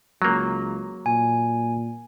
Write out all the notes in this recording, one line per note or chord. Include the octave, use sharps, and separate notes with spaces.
C#2 F#3 A#3
A#2 G#5